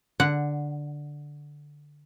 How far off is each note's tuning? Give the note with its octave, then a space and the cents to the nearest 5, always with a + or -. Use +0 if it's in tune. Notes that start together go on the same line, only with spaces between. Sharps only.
D3 +0 F#5 +0